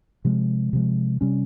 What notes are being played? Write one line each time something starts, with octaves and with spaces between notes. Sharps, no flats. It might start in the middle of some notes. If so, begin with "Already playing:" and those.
C3 F3 G#3
C3 F3 G#3
C3 G3 C#4